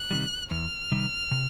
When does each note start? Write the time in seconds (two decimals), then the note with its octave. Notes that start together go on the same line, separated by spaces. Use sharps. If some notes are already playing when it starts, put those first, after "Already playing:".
Already playing: F#6
0.11 C3 D#3 G3
0.51 E2 F6
0.92 C3 D#3 G3
1.31 C3